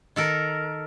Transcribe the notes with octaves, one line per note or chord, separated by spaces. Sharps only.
D#3 A4 A#4